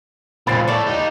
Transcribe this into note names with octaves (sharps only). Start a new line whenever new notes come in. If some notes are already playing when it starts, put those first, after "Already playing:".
C#2 A#2 C#3 C4 B5 A6 C7
A2 A4 C#5 D5
D#4 G4